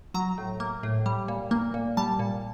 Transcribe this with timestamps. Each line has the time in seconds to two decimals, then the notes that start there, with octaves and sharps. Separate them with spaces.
0.14 F#3 A#5
0.38 A2
0.60 A#3
0.83 A2
1.06 G3
1.28 A#2
1.51 A#3
1.74 A#2
1.97 G3 A5
2.19 A#2